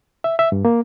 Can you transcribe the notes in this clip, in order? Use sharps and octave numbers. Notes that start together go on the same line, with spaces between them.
E5
E5
G2
A#3